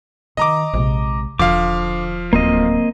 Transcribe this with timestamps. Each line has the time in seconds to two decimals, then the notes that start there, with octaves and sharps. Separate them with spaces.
0.37 D#3 D#5 A#5 D6
0.74 A#1 C3 G#3
1.39 E1 D3 F3 F5 D6
2.33 D1 D3 A#3 C4 D#5